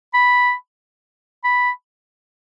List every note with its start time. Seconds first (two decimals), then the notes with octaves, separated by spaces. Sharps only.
0.14 B5
1.44 B5